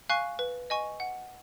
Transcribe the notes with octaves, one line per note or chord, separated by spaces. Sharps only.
F5 G#5 C#6 F#6
B4
D#5 G#5 C#6
F#5